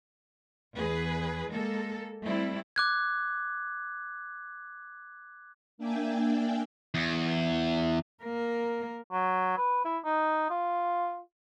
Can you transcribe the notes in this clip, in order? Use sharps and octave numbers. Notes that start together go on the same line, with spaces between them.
E2 G#4 B4
G#3 A#3 A4
G3 A3 C4 E4
D6 F#6 G#6
A#3 D4 D5 E5 G5 G#5
E2
A#3 A#4
F#3
B4
E4
D#4
F4